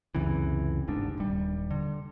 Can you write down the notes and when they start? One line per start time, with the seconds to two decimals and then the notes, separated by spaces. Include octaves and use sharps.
0.15 C#2 F#2 C3 E3
0.88 G1 D2 G#2 D4
1.18 D#1 G3
1.71 D3